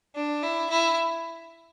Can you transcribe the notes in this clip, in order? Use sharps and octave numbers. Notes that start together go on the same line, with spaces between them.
D4
E4
E4